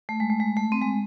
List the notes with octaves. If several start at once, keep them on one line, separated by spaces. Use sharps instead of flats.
A3
G#3
A3
G#3
A3
C4
G#3